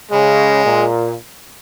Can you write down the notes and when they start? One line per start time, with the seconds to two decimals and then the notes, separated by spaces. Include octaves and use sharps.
0.11 C#3 G#3
0.65 A#2